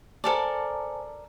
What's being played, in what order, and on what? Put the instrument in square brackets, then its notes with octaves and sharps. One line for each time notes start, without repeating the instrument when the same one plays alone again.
[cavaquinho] A4 A#4 D5 [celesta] C5 G#5 A5